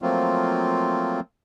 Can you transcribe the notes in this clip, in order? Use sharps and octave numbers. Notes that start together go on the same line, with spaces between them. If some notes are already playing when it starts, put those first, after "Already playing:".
F3 F#3 A3 A#3 C4 F4